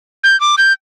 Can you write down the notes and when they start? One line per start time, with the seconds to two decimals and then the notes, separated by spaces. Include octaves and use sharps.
0.24 G6
0.40 D6
0.58 G6